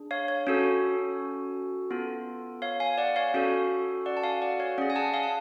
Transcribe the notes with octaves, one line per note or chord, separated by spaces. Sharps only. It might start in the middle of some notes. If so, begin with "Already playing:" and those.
Already playing: D4 G#4
C#5 F5
C#5
C#4 F#4 A4 C#5
B3 F4 A4
C#5 F5
F5 G#5
D5 F#5
C#5 F5
C#4 F#4 A4
D5 F#5
A5
F5 G#5
D5 F#5
C#5 F5
C#4 G#4 D5 F#5
G#5
F#5 A5
F5 G#5
A5